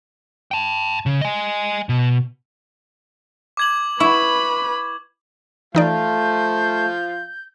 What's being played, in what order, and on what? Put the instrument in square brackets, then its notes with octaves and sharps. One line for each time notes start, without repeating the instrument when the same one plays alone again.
[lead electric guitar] G5 A5
C#3
D#5 G#5
B2
[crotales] D6 G#6 F#7
[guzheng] E4 [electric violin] B4 B5 [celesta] C#6
[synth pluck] E3 D#4 D5 [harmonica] F3 F4 F5 [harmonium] A3 [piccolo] G6